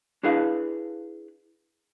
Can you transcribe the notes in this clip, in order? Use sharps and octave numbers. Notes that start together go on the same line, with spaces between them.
D4 E4 G#4 B4 F5